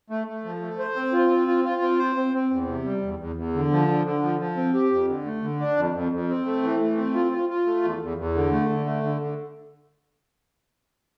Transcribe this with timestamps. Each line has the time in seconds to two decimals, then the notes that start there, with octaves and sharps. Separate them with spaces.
0.10 A3
0.27 A3
0.45 F3
0.62 A3
0.79 C5
0.96 C4
1.13 F4
1.30 C4
1.48 F4
1.64 F4
1.82 C4
1.99 C5
2.16 C4
2.34 C4
2.51 E2
2.67 C3
2.85 G3
3.02 E2
3.19 E2
3.36 E2
3.54 D3
3.71 F3
3.88 D3
4.05 D3
4.23 F3
4.39 F3
4.57 C4
4.74 G4
4.91 F2
5.08 D3
5.25 A3
5.42 D3
5.60 D4
5.76 F2
5.94 F2
6.12 F2
6.29 C4
6.46 A3
6.63 E3
6.80 A3
6.97 C4
7.14 F4
7.32 F4
7.49 F4
7.66 A3
7.83 E2
8.01 E2
8.17 E2
8.35 D3
8.52 A3
8.69 D3
8.86 A3
9.03 D3
9.21 D3